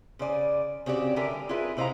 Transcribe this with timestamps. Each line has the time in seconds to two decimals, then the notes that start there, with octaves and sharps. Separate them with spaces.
0.19 C#3 C5 D5 G#5
0.86 C#3 C4 F#4 G4 D5
1.16 D3 G4 A4 A#4 E5 G#5
1.31 G3
1.49 E4 F4 G#4 A#4 B4 E5
1.77 C3 E4 C5 D#5 F5 A#5